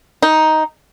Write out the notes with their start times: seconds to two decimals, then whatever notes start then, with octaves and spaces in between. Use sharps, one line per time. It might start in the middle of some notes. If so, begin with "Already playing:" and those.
0.22 D#4